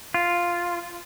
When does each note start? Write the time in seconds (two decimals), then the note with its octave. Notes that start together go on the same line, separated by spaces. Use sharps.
0.14 F4